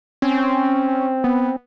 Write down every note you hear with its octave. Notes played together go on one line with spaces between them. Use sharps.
C4 C#4
B3